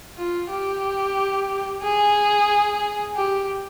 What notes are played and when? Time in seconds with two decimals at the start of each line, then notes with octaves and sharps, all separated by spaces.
0.17 F4
0.50 G4
1.82 G#4
3.16 G4